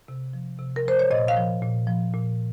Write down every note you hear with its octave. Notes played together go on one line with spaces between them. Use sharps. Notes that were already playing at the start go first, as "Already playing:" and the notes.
C3
F3
C3
A#4
F3 C5
C#5
A#2 D#5
F5
F3
A#2
F3
A#2